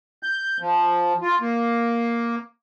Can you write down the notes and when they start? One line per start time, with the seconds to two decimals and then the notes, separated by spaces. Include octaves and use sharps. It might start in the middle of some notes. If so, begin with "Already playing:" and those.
0.23 G6
0.60 F3
1.22 F4
1.41 A#3